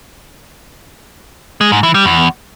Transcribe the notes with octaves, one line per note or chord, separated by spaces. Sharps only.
G#3
G#2
E3
G3
E2